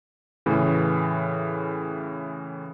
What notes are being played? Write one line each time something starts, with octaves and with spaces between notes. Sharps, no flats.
A2 C#3 E3